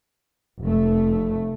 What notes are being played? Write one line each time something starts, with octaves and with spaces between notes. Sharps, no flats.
F1 A3